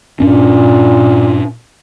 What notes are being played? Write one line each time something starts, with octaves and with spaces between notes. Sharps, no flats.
G2 A#2 C#4 D4